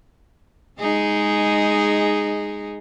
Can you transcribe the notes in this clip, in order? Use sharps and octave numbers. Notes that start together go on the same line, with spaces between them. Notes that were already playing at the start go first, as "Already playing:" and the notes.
G#3 D#4 G#4